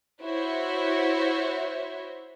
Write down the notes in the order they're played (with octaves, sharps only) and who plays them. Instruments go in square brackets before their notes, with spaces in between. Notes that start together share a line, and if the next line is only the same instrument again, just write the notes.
[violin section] E4 F#4 C5 C#5 E5